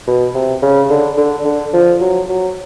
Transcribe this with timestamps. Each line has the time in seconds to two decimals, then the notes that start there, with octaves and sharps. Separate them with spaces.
0.07 B2
0.35 C3
0.62 C#3
0.90 D3
1.17 D3
1.45 D3
1.73 F3
2.01 F#3
2.29 F#3